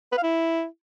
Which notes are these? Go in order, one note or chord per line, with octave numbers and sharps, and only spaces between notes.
B4
F5
E4